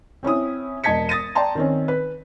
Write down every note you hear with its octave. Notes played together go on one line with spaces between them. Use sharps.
C4 C#4 E4 D#6
E1 D#5 A5 G#6 B6 C#7
D#6 A6 A#6 D#7
D5 G5 A5 A#5 C6
D#3 C4 C#4
B4